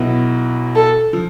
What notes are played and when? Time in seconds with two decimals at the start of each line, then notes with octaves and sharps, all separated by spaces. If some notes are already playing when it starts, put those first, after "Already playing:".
Already playing: B1 B2 B3 E4
0.76 A4
1.13 F3